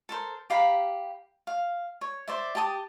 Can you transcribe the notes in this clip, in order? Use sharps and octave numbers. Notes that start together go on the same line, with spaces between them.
A4 A#4 C5
G4 F5 A#5 B5
F5
C#5
C5 D5 E5
G4 G5 A5 D#6